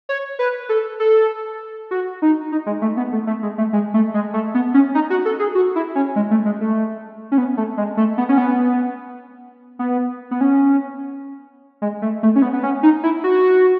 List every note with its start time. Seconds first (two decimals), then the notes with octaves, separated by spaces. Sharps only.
0.09 C#5
0.39 B4
0.69 A4
1.00 A4
1.91 F#4
2.22 D#4
2.52 D#4
2.66 G#3
2.82 A3
2.97 B3
3.13 A3
3.27 A3
3.43 G#3
3.58 A3
3.73 G#3
3.94 A3
4.14 G#3
4.34 A3
4.54 B3
4.74 C#4
4.95 D#4
5.10 F#4
5.25 A4
5.39 G#4
5.55 F#4
5.76 E4
5.95 C#4
6.16 G#3
6.31 A3
6.46 G#3
6.61 A3
7.32 C#4
7.38 B3
7.57 A3
7.78 G#3
7.97 A3
8.18 B3
8.29 C#4
8.38 B3
9.79 B3
10.31 B3
10.41 C#4
11.82 G#3
12.02 A3
12.23 A3
12.36 C#4
12.42 B3
12.53 B3
12.63 C#4
12.83 D#4
13.03 E4
13.24 F#4